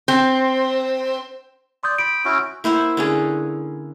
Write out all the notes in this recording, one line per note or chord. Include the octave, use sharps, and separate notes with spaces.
C4
D5 C6 D#6 G6
B5 D7
C#4 E4 F#4
A#3 E4 C5 F#5
D3 C#4 G#4